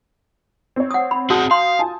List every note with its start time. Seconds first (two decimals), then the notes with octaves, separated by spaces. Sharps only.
0.76 C4 C#5
0.91 F#5 D#6
1.11 B5
1.30 C4 F#4 G#4 F#5 A5 D#6 G6
1.51 F5 C6
1.79 F4 G#5 A5